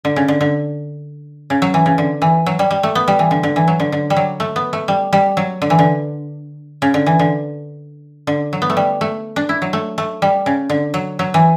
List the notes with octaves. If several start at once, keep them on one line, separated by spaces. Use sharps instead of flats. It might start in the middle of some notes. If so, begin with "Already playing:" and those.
D3
C#3
D3
D3
C#3
F#3
E3
C#3
D3
E3
F#3
G3
G3
A3
B3
G3
E3
D3
D3
E3
F#3
D3
D3
G3
F#3
A3
B3
A3
G3
G3
F#3
D3
E3
D3
C#3
D3
E3
D3
D3
F#3
B3
A3
G3
A3
D4
E4
F#3
A3
A3
G3
C#3
D3
F#3
F#3
E3